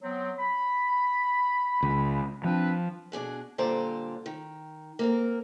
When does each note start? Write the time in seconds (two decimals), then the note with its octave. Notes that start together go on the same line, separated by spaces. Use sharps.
0.02 F#3 B3 C4
0.39 B5
1.82 C#2
2.44 F3 C4 D4 B4
3.12 B2 D4 G#4 F#5
3.58 A#2 D3 G3 C5 D5 A#5
4.26 D#3
4.99 A#3 C4 A#4